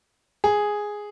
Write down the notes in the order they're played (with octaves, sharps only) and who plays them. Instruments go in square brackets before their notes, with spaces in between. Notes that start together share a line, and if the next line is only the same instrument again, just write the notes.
[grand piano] G#4